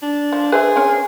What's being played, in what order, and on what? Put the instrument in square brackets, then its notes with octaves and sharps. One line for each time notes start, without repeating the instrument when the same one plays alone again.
[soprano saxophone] D4
[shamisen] F3
[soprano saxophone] G#4 [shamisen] B4 C5 E5
[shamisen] C4 C#4 C#5